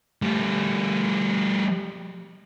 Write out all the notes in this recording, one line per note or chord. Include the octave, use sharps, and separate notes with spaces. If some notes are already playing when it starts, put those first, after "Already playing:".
G3 A3